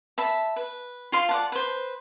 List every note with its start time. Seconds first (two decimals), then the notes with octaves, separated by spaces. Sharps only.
0.18 E5 A5 B5
0.56 B4
1.12 F4 F5 C6
1.29 D5 F#5 A5
1.52 B4 C5